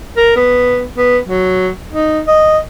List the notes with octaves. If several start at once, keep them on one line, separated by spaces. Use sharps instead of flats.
A#4
B3
B3
F#3
D#4
D#5